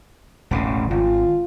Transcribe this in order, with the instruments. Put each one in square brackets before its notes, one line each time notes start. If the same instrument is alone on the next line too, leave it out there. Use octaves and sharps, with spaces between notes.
[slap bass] E1 A1 C#3
[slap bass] G#1 [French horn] F4